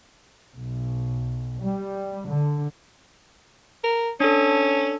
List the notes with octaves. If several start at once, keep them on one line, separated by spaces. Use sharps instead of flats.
B1
G3
D3
A#4
C#4 D4 A4